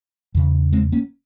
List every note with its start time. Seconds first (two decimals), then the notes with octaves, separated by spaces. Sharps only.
0.35 E2 C#3
0.72 G#3 C4
0.92 A#3 C#4